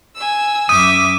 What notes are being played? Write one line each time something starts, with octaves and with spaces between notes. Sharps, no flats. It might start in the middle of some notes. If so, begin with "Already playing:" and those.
G#5 E6
F#2 E5 D6 D#6 D#7